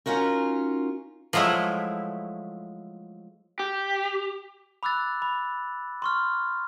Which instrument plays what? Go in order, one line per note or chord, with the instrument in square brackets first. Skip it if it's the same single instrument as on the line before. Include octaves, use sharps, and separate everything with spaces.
[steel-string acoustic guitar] C#4 D#4 F4 F#4 A#4
[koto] F3 F#3 G#3 A3 E4
[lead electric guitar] G4
[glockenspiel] B5 D6 E6 F#6 A6
B5
C6 C#6 F6